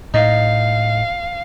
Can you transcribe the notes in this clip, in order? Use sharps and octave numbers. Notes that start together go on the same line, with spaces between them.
A2 D#4 F5